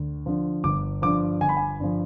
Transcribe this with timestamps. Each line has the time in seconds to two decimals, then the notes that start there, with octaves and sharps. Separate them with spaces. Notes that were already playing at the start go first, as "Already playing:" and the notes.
Already playing: D2
0.26 D3 F3
0.64 G1 D6
1.02 G2 D3 F3 D6
1.41 G1 G#5
1.49 B5
1.57 G#5
1.80 G2 D3 F3